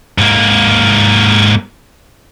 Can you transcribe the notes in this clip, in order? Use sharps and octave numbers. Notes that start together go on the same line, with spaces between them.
G#2 A#3